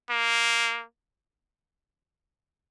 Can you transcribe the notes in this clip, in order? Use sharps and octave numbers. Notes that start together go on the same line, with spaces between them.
A#3